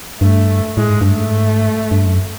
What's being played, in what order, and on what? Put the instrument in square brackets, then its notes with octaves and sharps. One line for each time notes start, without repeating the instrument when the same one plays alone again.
[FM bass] G2 [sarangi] A3
[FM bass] A2 [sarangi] G#3
[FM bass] G#2
G2
[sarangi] A3
[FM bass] G#2
G2
F#2